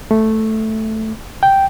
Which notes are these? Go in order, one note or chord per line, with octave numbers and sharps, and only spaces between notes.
A3
G5